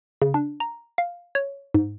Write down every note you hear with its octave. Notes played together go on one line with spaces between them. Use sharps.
C#3
D4
A#5
F5
C#5
G#2